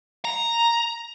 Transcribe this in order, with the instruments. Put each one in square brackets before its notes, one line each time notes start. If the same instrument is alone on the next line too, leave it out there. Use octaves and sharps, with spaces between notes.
[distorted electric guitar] A#5